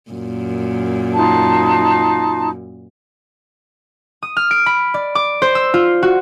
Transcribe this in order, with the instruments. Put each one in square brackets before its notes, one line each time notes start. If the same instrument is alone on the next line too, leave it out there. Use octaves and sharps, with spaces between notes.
[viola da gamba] F#2 A#2
[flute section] D#4 F4 A5
[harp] D#6
F6
D7
B5
D5
D6
C5
E6
F4
F#4